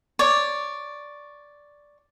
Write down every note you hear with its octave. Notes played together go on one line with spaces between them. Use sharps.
C#5 D5